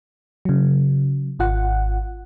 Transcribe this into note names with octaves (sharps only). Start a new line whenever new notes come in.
C#3 F#3
G#1 F4 F#5